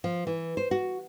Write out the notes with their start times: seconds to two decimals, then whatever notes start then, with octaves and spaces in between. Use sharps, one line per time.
0.04 F3
0.27 E3
0.57 C5
0.71 F#4